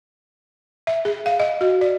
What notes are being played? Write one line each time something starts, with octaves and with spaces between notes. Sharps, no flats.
E5
G#4
F5
D#5
F#4
D5